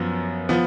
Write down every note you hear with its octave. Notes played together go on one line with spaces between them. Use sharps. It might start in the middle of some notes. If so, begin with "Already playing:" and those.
Already playing: F#2 F3 B3
F3 B3